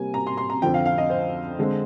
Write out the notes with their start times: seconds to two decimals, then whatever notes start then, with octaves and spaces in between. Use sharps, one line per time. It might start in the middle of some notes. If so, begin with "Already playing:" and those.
Already playing: C3 G3 A#3 G#5
0.14 A#5
0.27 C6
0.37 C6
0.50 A#5
0.62 F2 D3 F3 G5
0.74 F5
0.86 F5
0.98 D#5
1.10 C5
1.59 D3 G#3 C4